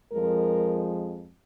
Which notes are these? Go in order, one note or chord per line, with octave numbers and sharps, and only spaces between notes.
F2 F3 G#3 A#4